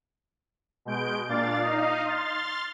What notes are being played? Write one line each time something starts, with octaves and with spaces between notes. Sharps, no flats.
B2 G#3 G6 D7
A#2 D4 D5 F5 A6
D#4 D#5 F5
C6 F6 A6